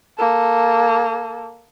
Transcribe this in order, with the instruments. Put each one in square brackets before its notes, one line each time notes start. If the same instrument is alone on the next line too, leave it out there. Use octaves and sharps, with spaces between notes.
[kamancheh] A#3 A4